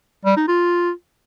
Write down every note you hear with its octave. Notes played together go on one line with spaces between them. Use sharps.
G3
D#4
F4